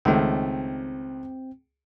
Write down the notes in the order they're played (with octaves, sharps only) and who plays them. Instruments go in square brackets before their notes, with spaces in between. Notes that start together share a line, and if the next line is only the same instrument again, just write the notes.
[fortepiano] C#2 D#3 A3 [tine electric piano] C4 G5